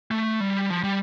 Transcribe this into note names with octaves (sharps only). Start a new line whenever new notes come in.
A3
G3
F3
G3